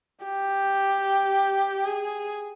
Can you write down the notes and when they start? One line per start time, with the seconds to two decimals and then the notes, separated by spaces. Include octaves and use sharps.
0.25 G4
1.86 G#4